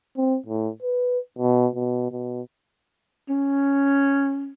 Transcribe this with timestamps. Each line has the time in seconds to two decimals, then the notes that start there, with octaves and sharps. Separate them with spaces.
0.17 C4
0.46 A2
0.82 B4
1.39 B2
1.75 B2
2.12 B2
3.29 C#4